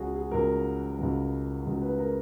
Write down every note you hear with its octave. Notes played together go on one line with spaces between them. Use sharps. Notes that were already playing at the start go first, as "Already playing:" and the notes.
Already playing: C#2 C#3 F#3 F#4 G#4
G#4
C#2 C#3 F#3 A#4
C#2 C#3 F#3
C#2 C#3 F#3
B4
A#4